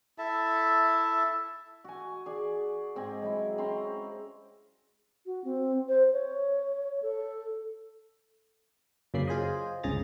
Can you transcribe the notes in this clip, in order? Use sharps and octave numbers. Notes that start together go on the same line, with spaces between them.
E4 A4 E5 A5
F#4 G#5
G#4 D5 G#5
G#2 C4 D#5 G#5
F#3 G#3 E4
C4 C#4 A#5 C6
F#4
C4
C5
C#5
A4
F#2 C#3 A#3 D5 B5 C7
F4 G#4 C5 D#5
G1 C#2 C#3 G#4 A#5 A6